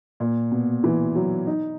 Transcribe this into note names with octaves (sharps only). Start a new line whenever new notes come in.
A#2
B2
E3
F#3
D#4